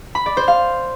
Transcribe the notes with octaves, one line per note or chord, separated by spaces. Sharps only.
B5
D5
C5
F5